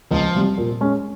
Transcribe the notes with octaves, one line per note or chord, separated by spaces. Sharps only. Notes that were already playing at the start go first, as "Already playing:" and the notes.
C#2 F3
C3 G3
A#2
G#3 C#4 G#4